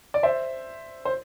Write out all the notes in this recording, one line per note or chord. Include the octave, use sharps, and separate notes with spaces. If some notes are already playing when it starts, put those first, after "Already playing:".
D5
C5 E5
C5